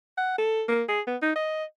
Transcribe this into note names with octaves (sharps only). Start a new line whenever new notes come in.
F#5
A4
A#3
G#4
B3
D#4
D#5